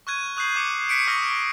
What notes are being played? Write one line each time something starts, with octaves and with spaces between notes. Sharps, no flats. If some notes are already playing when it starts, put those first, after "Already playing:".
C#6 F6 F#6 G#6 D#7
C#6 D#6 F#6 G6 C7 F#7
D6 C#7
F#6 B6 C#7 D7
C#6 D#6 F6 F#6 A#6 B6